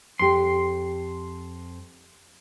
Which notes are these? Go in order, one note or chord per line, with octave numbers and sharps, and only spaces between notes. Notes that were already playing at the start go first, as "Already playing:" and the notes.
F2 G4 C6